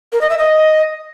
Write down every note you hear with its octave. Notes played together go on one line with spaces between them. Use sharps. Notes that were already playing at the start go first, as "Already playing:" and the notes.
A#4
D#5
E5
D#5